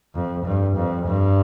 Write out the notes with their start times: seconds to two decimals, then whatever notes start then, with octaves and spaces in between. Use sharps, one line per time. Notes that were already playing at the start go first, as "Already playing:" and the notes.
0.15 F2
0.45 G2
0.77 F2
1.07 G2